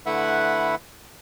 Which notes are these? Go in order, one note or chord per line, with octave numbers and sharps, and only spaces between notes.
D3 A3 E4 B4 E5 F#5